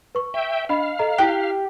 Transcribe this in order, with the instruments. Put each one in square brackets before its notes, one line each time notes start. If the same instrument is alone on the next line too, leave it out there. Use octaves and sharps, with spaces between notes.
[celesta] B4 C#6
[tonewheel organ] E5 G5
[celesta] D4 D#5 B5 [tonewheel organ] F5
[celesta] A4 D#5 A#5
[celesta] E4 F#6 [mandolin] G4